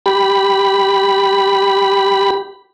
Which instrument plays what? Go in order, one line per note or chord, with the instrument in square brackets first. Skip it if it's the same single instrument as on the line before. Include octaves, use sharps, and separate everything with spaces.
[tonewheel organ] G4 B5